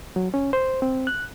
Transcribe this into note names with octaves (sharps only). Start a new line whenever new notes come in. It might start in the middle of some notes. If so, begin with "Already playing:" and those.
F#3
C#4
C5
C4
F#6